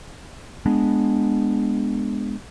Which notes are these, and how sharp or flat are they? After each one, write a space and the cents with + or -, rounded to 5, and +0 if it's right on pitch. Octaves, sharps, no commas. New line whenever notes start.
G#3 +0 B3 +0 D4 +0